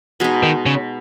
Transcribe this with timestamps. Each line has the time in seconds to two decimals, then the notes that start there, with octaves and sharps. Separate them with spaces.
0.20 B2 G#3 D#4
0.43 D#3
0.66 C#3